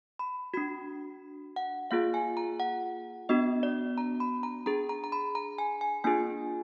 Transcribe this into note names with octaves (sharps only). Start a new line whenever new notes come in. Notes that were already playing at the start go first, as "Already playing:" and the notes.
B5
D4 F#4 B5
F#5
A#3 F4 G#4 F5
G#5
A#5
F#5
B3 D4 F#4 D#5
D5
A#5
B5
A#5
D4 G#4 A#5
A#5
A#5
B5
A#5
G#5
G#5
A#3 D4 F4 G#4 G#5